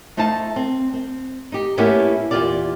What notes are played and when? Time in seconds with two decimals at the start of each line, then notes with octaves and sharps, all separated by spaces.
0.17 A3 D#4 C5 F5 A5
0.56 C4
0.94 C4
1.52 D#4 G4
1.77 A2 A#3 B3 C#4 E4 G4
2.31 E2 A#2 F#3 F4 G4 D5